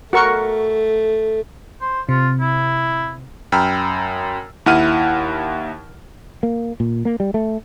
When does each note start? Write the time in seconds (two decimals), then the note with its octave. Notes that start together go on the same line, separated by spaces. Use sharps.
0.13 A3 F#4 A#4 C#6
1.81 C5
2.09 C3 F4
2.40 E4
3.52 F#2 G5 A#5 B5 E6 F6
4.66 D#2 E4 F#5 F6 D#7
6.43 A#3
6.80 A#2
7.05 A#3
7.20 G3
7.34 A3